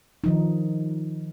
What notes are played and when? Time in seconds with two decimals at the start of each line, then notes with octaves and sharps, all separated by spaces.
0.24 D#3 F3 D#4